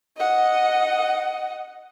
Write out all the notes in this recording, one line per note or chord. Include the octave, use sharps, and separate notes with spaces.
D#5 F#5